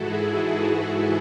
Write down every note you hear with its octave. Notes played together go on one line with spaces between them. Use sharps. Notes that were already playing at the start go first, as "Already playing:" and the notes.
Already playing: G#2 E3 E4 F#4 G#4 A4
E4 G#4